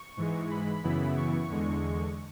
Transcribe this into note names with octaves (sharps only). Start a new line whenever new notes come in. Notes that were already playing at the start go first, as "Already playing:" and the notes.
Already playing: C#6
G#2 E3 G#3
B5
F#2 C#3 E3 B3 E4
C#6
E2 D3 G#3